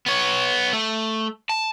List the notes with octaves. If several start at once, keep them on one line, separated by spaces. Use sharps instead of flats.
B3 C#5
A3
A5